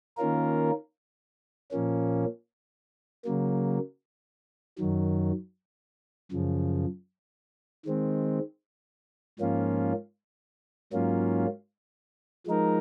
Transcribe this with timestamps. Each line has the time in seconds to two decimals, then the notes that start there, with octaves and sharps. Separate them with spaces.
0.17 D#3 A#3 C#4 F4 A#4
1.71 A#2 F3 A#3 C#4
3.25 C#3 F#3 A#3
4.79 F#2 D#3 F#3
6.32 F#2 C#3 F3
7.86 D#3 G#3 C4
9.39 G#2 F3 A#3 C#4 F4
10.93 G#2 F#3 A#3 C#4 F4
12.47 F3 G#3 D#4 A#4